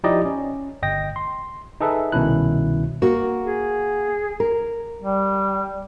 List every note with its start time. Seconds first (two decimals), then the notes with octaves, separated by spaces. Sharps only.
0.04 F3 D#4 E4 G4 D5 D#5
0.25 C#4
0.83 G1 D#5 G5 A#6
1.16 C6
1.80 D#4 G#4 A4 B4 E5
2.12 C2 B2 D#3 C#4 E4 F#6
3.02 A#3 F#4
3.45 G#4
4.40 A#4
5.02 G3